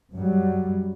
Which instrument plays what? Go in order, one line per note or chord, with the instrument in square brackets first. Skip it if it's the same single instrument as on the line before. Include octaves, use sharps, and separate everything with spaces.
[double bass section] F#2 F#3 G3